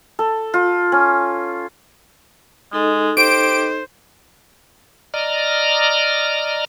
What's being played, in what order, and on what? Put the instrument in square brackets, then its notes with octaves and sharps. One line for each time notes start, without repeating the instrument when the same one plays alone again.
[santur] A4
F4
C#4
[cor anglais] G#3 [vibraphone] D#4 A4 D#5
[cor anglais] G4 [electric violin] C5 [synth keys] D7
[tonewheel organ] D5 D#5 A#5 F6